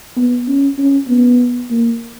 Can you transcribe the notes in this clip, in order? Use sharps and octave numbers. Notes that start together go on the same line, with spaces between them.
B3
C#4
C#4
B3
A#3